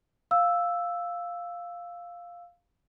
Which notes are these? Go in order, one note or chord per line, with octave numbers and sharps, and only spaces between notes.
F5 E6